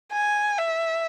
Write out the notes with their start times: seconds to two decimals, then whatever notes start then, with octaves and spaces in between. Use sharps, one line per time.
0.12 G#5
0.58 E5